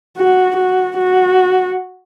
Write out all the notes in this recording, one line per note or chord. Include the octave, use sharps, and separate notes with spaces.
F#4
F#4
F#4